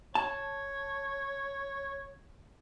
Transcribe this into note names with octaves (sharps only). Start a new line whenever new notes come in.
C#5 A5